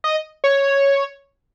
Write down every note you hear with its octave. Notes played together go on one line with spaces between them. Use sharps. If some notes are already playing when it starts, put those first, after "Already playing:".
D#5
C#5